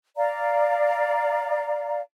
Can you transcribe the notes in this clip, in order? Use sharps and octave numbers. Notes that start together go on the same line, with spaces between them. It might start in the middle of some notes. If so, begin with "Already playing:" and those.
D5 F5 A#5